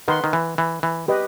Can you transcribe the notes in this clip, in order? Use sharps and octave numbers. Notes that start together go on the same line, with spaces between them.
D#3 B4 F#5 C6
D#3
E3
E3
E3
G4 B4 D#5